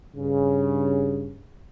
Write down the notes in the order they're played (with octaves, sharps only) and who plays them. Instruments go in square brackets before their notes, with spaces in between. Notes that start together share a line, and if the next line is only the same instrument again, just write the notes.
[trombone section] G2 C#3